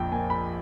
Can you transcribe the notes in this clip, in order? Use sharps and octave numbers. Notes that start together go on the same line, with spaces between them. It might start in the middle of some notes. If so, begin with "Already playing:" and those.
Already playing: A#1 F2 G5
A#3 G#5
B5